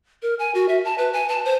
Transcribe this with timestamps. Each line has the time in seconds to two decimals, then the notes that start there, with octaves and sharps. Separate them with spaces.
0.22 A#4
0.39 G#5
0.55 F#4
0.69 E5
0.85 A5
0.98 B4
1.13 G#5
1.29 A5
1.45 C5